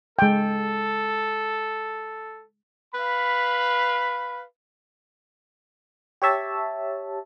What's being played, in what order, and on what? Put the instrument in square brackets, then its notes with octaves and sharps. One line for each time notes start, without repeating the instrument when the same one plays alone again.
[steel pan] G#3 G5 [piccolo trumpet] A4
[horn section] B4 F5 B5
[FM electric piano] G4 C#5 E5 A5